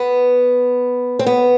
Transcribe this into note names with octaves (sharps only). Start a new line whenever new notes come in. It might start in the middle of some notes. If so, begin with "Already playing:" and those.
Already playing: B3
C4
B3